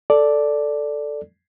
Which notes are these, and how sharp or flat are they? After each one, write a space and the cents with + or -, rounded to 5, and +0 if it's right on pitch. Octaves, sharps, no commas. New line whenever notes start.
A4 +0 D5 +0